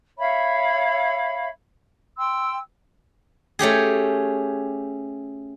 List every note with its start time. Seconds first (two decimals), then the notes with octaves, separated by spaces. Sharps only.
0.18 C#5 E5 F5 B5
2.17 G5 C6 E6
3.59 A3 C#4 G4 G#4